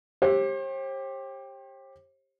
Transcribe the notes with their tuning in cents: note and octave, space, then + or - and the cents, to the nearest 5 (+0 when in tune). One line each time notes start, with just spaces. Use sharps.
G4 +5 C5 +45